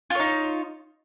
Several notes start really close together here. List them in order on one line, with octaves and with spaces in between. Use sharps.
F4 C#5 D#4